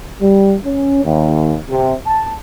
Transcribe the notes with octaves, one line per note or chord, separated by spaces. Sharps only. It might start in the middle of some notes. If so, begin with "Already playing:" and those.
G3
C#4
D#2
C3
A5